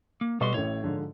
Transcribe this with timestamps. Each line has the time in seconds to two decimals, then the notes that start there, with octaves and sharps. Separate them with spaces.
0.21 A#3
0.40 B2 G3 B4 D#5 C6 C#6
0.54 A1 A2 C#5
0.83 G#2 D3 F3